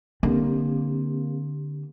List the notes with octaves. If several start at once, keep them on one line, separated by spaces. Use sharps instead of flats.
D3 A#3 C4 G4